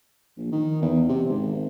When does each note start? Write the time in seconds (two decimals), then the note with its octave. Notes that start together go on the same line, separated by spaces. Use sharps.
0.37 A#1
0.52 D#3
0.82 E2
1.09 C3
1.29 G#1